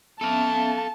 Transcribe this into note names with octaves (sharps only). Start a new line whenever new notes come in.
B3 C#4 A4 E5 F5 A5